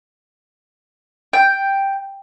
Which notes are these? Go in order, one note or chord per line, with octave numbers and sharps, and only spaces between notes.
G5